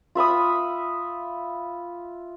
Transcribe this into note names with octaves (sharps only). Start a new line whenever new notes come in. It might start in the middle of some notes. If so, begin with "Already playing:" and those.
F4 E5 B5 D#6